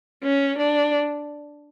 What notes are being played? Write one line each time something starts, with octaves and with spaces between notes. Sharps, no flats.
C#4
D4